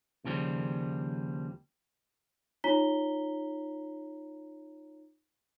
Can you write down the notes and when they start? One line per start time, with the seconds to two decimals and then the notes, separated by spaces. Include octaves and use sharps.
0.24 D#2 C#3 F3 G3
2.64 D#4 F4 C#5 A#5 B6 G7